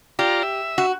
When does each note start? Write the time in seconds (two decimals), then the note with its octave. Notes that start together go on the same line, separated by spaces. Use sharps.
0.19 F4 G4 D5 A#5
0.43 E5
0.78 F#4